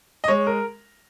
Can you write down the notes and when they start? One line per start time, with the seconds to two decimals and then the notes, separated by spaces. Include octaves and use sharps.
0.24 D#5
0.28 G#3 C#5
0.47 A#4